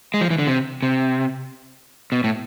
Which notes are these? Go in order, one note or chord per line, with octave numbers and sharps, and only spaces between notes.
G#3
F3
E3
D3
C3
C3
B2
A2